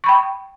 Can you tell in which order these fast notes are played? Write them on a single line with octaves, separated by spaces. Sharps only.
C#6 B5 G5